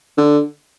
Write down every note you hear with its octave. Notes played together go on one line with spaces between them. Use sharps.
D3